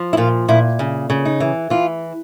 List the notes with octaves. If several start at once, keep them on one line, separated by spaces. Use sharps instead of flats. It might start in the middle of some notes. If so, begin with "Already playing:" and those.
Already playing: F3
E4
A#2 F4
A#2 E4
C#3
C#3
D#4
E3
E3 F4